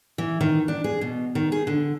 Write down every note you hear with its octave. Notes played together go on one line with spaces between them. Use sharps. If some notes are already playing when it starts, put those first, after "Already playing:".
E3
D#3
D4
G#4
B2
D#3
G#4
D3